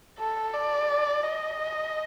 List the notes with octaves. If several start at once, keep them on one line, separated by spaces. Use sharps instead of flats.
A4
D5
D#5